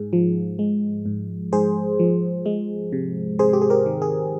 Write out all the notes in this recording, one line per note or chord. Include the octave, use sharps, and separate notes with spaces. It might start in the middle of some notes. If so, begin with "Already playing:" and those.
Already playing: G#2 G#3 G#4
F3
G#3
G#2
G#2 G#4 C5
F3
G#3
C3
C3 G#4 C5
G4
G#4
G4 A#4
D#3
G#4